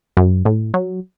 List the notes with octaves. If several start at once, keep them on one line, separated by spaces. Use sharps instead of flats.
F#2
A2
F#3